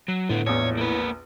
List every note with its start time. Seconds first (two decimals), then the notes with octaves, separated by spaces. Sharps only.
0.08 F#3
0.29 A2 D3 B3
0.46 A#1 E2 C#5
0.77 A#3 B4